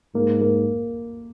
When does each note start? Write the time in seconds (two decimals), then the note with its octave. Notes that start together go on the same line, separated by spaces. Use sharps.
0.15 G#2 A#3
0.41 A#3